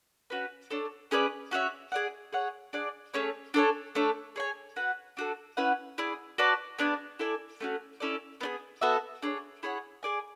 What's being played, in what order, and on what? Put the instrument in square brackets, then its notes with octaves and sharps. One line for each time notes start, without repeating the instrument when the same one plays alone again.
[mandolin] C#4 F#4 B4
D4 A4 C#5
C#4 G#4 B4 D5
C#4 F#4 C#5 E5
G#4 D5 F#5
G#4 C#5 F#5
D4 G#4 D5 F#5
A3 C#4 G#4 C#5
D4 A4 C#5 G#5
A3 D4 A4 C#5
G#4 C#5 G#5
F#4 B4 F#5
D4 F#4 A4
C#4 E4 B4 F#5
E4 G#4 D5
F#4 B4 D5 A5
B3 D4 G#4 D5
E4 A4 D5 G#5
A3 C#4 F#4
C#4 E4 A4 D5
B3 D4 G#4
B3 F#4 A4 E5
D4 G#4 C#5
E4 G#4 C#5 F#5
G#4 D5 G#5